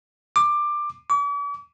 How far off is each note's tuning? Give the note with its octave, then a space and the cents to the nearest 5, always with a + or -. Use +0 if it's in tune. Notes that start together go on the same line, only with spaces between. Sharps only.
D6 +15
D6 -45